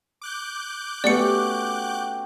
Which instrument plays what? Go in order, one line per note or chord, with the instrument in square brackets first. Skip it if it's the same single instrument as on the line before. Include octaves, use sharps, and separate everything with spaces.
[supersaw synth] D6 F#6 G6
[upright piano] A3 B3 [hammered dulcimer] C#4 F#4 G4 [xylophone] D5 C#7